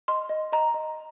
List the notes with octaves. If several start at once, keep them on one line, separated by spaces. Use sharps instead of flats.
D#5 C6
D#5
D#5 A#5
D#5